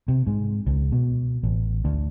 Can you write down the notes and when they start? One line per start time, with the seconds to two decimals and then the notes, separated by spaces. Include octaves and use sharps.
0.08 C3
0.27 G#2
0.67 C#2
0.92 B2
1.43 A1
1.85 D2